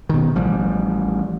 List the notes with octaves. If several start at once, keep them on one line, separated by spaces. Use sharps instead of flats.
B2 D#3
A1 F3 G3